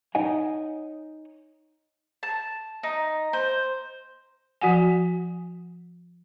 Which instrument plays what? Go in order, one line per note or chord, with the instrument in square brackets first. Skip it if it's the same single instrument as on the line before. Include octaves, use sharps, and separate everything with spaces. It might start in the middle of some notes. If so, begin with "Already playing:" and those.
[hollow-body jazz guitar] D#4 C#5 D#5 F#5 G#5
[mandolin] A5
D#4
C5
[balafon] F3 F#4 F#5 G#5